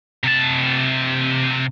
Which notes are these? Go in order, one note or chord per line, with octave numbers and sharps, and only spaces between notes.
C3 A5